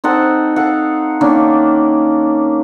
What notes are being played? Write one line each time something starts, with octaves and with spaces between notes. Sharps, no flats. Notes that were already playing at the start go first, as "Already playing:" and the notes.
C4 D#4 A4 F#5
A4 F5 F#5
D#3 A#3 C#4 D4